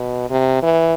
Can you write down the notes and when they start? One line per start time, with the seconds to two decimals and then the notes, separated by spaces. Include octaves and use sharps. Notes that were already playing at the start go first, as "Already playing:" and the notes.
Already playing: B2
0.30 C3
0.63 E3